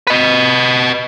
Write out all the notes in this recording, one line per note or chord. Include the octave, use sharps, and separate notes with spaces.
B4 D#5